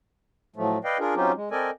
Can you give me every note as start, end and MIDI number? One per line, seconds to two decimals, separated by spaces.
0.56 0.78 45
0.56 0.78 53
0.56 0.78 54
0.56 0.78 57
0.84 0.98 71
0.84 0.98 74
0.84 0.98 75
0.84 0.98 77
0.84 0.98 79
0.99 1.15 62
0.99 1.15 65
0.99 1.15 68
0.99 1.15 70
1.15 1.32 54
1.15 1.32 60
1.15 1.32 61
1.15 1.32 63
1.15 1.32 65
1.15 1.32 67
1.35 1.49 56
1.51 1.70 60
1.51 1.70 69
1.51 1.70 70
1.51 1.70 74
1.51 1.70 75
1.51 1.70 80